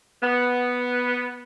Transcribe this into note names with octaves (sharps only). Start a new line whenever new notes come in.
B3